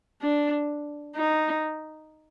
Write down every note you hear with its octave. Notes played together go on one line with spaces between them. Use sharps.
D4
D#4